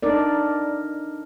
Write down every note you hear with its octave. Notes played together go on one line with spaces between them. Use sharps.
D4 D#4 A#4 D5